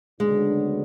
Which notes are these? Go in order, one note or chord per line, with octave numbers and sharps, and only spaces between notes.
D2 C#3 F#3 G#3 B3 D4